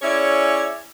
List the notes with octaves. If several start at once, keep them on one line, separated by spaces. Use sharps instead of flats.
C#4 E4 G#4 C#5 D5